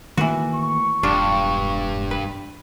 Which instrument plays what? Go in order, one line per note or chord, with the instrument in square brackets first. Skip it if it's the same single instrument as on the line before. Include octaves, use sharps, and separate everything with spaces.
[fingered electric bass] D#3 A3 A#3 [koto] E3 F#4
[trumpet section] C#6
[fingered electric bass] E1 [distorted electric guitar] G2 [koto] D4 F4
[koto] B4